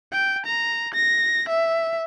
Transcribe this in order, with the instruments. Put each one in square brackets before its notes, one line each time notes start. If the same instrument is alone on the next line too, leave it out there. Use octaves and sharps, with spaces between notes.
[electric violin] G5
A#5
A#6
E5